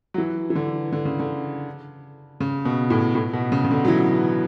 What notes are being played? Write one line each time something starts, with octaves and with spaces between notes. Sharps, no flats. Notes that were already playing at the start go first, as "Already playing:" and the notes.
F#3
E3
E3
D3
D3
C#3
D3
C#3
B2
A2
A2
B2
C#3
C#3
D3
F#3
E3